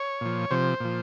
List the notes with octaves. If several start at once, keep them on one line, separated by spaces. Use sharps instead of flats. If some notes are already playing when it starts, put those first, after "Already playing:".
Already playing: C#5
A#2 F3
C3 F3 C5
A#2 F3